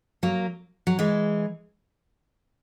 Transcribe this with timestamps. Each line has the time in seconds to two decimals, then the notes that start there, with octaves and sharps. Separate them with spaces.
0.23 F#3 A#3
0.87 F#3
0.99 E3 G#3